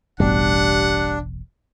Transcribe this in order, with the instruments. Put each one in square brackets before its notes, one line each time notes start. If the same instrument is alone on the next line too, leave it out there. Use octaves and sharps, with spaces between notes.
[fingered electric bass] E1 A1 B2 [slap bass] G3 [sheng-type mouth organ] D4 [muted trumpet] F#5